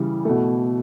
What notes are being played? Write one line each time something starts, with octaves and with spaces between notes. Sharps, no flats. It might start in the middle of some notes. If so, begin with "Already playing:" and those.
Already playing: C#3 E3 G3
B2 A3